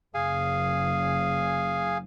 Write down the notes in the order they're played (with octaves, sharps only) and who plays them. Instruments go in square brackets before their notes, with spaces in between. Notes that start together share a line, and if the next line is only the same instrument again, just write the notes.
[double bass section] F#1 [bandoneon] G#4 F5 G#5